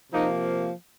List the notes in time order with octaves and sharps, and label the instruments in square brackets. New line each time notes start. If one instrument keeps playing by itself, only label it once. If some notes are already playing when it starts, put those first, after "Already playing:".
[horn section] C3 F3 A#3 D#4